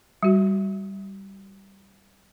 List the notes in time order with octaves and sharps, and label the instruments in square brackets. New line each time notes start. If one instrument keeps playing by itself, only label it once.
[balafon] G3 F#4